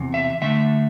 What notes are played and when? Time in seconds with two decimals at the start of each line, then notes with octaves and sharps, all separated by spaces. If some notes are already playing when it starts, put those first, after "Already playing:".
Already playing: E2 C3
0.14 E5
0.41 D3 A3 D4 E5